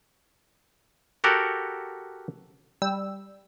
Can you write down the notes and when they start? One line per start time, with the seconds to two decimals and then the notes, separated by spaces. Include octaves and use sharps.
1.24 F#4 G4 A4 A#4 F#5
2.82 G3 E6